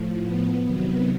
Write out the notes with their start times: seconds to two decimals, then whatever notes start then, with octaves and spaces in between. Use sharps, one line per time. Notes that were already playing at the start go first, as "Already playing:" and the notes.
Already playing: A2 F3
0.21 B3
0.64 C3 D#3 F#3 B3